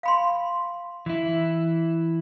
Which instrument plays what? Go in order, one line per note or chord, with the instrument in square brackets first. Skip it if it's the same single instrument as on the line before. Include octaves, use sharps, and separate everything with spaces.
[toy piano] F5 B5 C6
[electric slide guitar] E3 E4